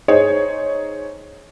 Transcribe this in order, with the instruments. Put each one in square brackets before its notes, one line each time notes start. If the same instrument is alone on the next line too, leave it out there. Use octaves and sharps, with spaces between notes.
[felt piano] D#4 G#4 C5 C#5